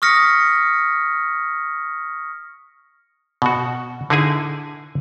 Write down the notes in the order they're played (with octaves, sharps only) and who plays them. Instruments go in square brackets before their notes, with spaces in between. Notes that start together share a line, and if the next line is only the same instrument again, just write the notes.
[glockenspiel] C#6 D#6 F6 A#6 B6 C#7
[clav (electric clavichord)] B2 F#4
D3 D#4 E4 G#4 G#5